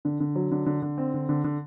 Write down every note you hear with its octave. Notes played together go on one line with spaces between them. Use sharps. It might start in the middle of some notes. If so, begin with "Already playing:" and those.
D3
D3
F#3
D3
D3
D3
C4
D3
D3
D3